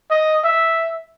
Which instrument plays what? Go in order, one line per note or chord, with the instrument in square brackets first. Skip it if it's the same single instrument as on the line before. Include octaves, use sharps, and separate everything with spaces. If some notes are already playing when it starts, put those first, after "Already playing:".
[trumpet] D#5
E5